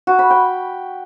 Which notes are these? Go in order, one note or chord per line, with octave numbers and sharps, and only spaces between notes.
F#4
B5
G5